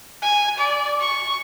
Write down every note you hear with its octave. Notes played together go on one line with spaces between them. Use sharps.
G#5
D5
C#6